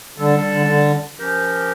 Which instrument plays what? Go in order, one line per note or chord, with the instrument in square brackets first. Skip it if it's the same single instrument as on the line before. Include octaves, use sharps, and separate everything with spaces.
[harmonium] D3 [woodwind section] G3 D4 A4
[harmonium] D3
D3
[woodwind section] F3 C#4 G4 A#4